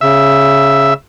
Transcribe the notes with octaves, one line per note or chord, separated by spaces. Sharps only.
C#3 E5